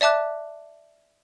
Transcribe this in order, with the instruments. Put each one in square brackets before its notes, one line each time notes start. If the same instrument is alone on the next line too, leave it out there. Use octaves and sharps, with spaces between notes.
[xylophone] D5 E5 A5 D6 F#6